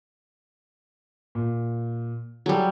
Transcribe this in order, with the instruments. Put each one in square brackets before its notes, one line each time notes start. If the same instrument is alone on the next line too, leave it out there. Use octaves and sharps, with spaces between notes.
[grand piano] A#2
[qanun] F#3 G3 [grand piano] G#4 A4